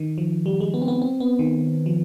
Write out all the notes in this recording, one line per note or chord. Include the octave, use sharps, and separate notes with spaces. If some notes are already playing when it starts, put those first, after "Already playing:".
Already playing: D#3
F3
G3
G#3
B3
C4
B3
C4
B3
D#3
F3